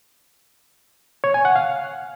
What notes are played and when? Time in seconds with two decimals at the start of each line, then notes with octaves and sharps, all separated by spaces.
1.24 C#5
1.34 G#5
1.45 F#5
1.56 F5